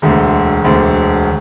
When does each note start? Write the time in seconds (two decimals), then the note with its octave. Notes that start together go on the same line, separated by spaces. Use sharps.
0.02 E1 D2 D3
0.64 E1 D2 D3